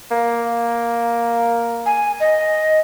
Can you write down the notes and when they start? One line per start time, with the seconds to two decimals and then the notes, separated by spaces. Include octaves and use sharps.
0.11 A#3
1.86 G#5
2.20 D#5